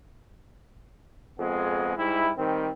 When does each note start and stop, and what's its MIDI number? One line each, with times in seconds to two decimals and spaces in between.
1.39 1.93 41
1.39 1.93 56
1.39 1.93 59
1.39 1.93 68
1.96 2.30 44
1.96 2.30 55
1.96 2.30 64
2.37 2.70 51
2.37 2.70 55
2.37 2.70 60